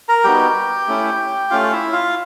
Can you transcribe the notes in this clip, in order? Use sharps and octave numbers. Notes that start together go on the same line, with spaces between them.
A#4 A#5
G3 B3 D#4 F#4 G4 G5
A3 C#4 E4
A3 C#4 F4 F5
E4 E5
F4 F5